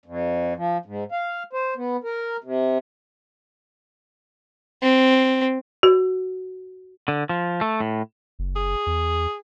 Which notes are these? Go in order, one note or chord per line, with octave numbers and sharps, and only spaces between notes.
F2
F3
G#2
F5
C5
B3
A#4
C3
C4
F#4
D3
F3
A3
A2
F#1
G#4
E2